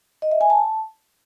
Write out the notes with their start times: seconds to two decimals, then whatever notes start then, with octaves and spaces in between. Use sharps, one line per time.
0.22 D#5
0.31 E5
0.41 G#5
0.50 A5